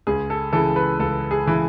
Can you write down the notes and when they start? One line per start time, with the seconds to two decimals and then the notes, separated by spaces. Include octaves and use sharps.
0.07 C#2 G#4
0.30 A4
0.53 C#3 E3 A4
0.76 B4
0.99 C#2 A4
1.31 G#4
1.47 C#3 E3